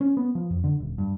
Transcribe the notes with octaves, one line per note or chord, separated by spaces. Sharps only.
C#4
B3
F3
F2
D3
D#1
G2